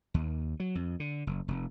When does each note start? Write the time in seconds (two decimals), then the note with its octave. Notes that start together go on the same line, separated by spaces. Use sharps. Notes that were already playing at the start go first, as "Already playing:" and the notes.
0.14 D#2
0.60 F#3
0.75 F2
1.00 D3
1.27 F#1
1.48 F1